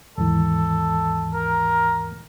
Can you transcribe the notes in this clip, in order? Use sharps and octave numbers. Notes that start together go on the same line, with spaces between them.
D#2 G#2 E3 A4
A#4